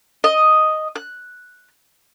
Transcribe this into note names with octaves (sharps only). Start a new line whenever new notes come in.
D#5
F#6